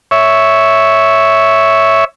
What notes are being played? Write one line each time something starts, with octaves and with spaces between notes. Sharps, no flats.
C#5 E5